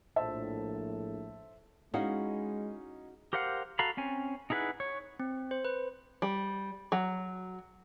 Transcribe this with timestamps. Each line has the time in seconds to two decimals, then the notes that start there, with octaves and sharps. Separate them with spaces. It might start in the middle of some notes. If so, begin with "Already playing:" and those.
0.16 A#1 A2 C5 E5 A5
1.94 G#3 C#4 D#4 E4 F#4 D#5 F5
3.33 G4 A#4 C5 F5 F#5
3.79 F#4 A4 F5 A#5 B5
3.97 C4 C#4 G#5
4.50 D#4 E4 G#4 B4 F#5
4.80 C#5
5.20 C4
5.51 C5
5.65 B4
6.22 G3
6.92 F#3